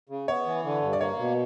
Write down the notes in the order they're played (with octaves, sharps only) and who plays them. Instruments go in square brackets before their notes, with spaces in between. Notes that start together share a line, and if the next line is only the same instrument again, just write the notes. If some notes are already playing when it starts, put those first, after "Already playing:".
[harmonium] C#3
[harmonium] B3 [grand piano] C#5
[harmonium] E3
D3
G2
[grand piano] D5
[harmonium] A#3 [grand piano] C#5
[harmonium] B2